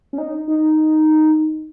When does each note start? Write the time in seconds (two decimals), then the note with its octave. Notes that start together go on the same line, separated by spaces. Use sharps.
0.13 C#4
0.18 D#4
0.48 D#4